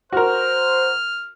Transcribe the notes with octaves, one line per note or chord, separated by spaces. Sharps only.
F#4 A#4 C5 F6